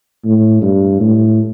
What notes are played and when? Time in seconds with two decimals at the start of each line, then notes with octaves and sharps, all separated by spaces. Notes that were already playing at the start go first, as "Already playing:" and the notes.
0.25 A2
0.62 G2
1.00 A2